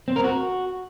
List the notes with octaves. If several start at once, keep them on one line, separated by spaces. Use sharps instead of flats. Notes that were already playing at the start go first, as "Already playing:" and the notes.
C4
A#4
F#4